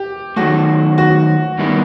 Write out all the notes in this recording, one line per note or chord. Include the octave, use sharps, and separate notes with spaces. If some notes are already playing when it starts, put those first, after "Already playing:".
Already playing: G4
D#3 F#3 A3 F#4
F#4
G2 D#3 G3 B3 E4